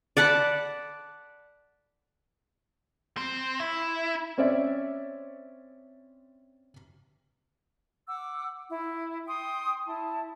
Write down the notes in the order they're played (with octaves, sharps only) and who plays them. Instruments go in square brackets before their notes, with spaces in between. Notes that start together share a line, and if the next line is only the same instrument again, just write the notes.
[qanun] D5 F#5 A5 B5
[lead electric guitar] C4
E4
[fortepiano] C4 C#4 C#5 D5 E5
[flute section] F#5 D6 E6
E4
G5 C6 D#6
E4 A5